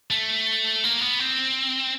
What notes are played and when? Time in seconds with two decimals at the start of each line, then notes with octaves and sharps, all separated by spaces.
0.10 A3
0.84 A#3
1.01 B3
1.19 C4